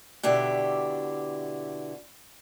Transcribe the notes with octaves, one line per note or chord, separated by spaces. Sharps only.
B2 D3 E4 G4